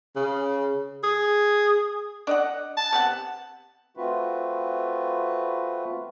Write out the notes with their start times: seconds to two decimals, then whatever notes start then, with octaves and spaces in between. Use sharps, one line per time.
0.16 C#3
1.03 G#4
2.27 D4 D#5 F#5
2.77 A5
2.92 C3 B3 F#5
3.97 A3 C4 F4 F#4 B4